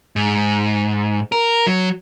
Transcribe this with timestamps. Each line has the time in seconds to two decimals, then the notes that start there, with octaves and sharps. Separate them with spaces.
0.16 G#2
1.32 A#4
1.67 F#3